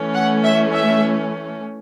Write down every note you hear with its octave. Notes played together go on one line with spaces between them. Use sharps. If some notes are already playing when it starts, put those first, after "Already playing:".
Already playing: E3 A3 C#4
F#5
E5
E5